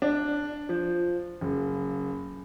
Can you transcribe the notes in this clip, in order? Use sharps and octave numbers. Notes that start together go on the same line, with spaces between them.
D4
F3
F#1